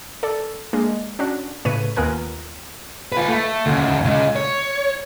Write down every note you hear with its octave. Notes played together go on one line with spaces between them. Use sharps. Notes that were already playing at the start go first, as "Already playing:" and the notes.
A4 D5
G#3 A#3 D4
C#4 D4 F#4
A2 C#3 B4 C#5 D#7
D#2 B3 F4 A#4 G#5 F#6
F4 B4
A3
D2 C#3
C#2 C#3
C#5